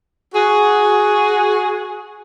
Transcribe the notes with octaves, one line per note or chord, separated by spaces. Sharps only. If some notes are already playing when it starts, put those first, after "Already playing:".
F#4 G#4